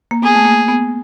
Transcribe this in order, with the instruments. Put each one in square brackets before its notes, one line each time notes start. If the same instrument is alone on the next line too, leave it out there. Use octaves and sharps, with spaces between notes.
[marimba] A#3
[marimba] B3 [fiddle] G#4
[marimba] A3
A#3
B3